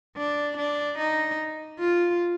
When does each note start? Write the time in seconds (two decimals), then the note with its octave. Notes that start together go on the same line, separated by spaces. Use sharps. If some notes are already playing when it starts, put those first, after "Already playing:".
0.17 D4
0.58 D4
0.99 D#4
1.79 F4